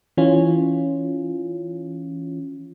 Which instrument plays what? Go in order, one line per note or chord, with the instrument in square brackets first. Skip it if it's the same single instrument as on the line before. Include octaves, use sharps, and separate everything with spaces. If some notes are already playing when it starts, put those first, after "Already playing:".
[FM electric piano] E3 C#4 F4